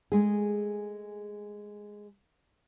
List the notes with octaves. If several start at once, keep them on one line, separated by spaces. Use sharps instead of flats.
G#3 A3 G#4